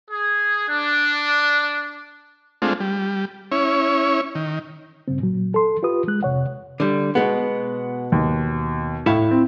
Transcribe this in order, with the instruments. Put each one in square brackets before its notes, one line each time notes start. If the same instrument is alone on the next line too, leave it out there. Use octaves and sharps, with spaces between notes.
[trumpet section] G#4
D4
[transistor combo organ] G#3 A3 C4 D4 F4
G3
C#4 E4 C#5
D#3
[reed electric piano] G2 C#3 C4
A#2 F#3
A4 C6
F4 G4 B4 D#6
G#3 F#6
F2 C3 C#5 F#5
[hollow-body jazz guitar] D3 G3
[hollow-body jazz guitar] B2 B3 [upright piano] G#3 F#5
[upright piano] D#2
[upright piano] A2 [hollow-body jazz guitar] E4 C#5 F5
[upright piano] C4